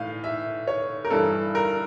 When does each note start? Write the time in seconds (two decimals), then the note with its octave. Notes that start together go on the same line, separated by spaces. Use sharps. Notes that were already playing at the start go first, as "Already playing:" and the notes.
Already playing: A2 E3 F5
0.24 E5
0.67 C#5
1.05 A#4
1.10 G2 E3 A4
1.55 A#4